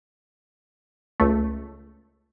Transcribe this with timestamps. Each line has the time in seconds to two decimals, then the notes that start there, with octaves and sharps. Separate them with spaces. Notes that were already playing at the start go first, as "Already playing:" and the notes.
1.20 C#2 A3